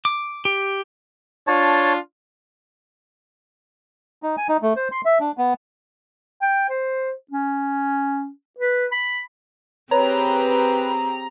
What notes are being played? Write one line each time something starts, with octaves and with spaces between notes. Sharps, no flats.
D6
G4
D4 F4 C#5 A5
D#4
G#5
D#4
A3
C5
C6
E5
D4
B3
G5
C5
C#4
B4
B5
C4 G4 G#4 B4 C#5 A#5